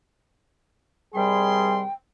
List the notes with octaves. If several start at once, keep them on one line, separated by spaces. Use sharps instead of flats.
C3 D#3 G3 G#4 G5 C6